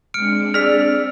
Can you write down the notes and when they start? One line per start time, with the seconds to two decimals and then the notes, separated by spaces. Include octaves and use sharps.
0.14 G#3 C4 D4 F6 C#7 D7
0.54 G#4 D5 E6 B6 F7